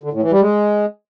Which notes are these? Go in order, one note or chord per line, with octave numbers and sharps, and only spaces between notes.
D3
A2
E3
G3
G#3